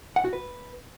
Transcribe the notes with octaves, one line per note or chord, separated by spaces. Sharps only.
F#5
F#4
B4